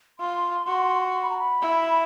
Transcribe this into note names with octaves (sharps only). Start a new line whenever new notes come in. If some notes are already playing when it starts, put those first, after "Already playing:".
F4 C6
F#4
C6
B5
A#5
B5
E4